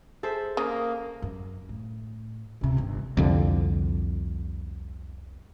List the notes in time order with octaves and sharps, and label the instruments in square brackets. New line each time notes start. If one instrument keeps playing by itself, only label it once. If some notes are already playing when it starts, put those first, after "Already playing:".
[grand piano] G#4 [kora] A4 C5 E5
[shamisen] C#3 [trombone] A#3 [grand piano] D#6
[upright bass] F#2
A2
C#2 C3
G1 D#3
[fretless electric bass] C2 F2 D3